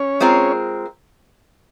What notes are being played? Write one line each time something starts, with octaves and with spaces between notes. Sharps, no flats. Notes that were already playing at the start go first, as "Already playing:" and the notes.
Already playing: C#4 C#5
G#3 C4 F4 A#4